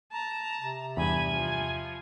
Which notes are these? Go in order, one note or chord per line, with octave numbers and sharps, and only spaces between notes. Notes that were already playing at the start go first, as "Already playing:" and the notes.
A5 A#5
C3
E2 G2 G#5 B5
F3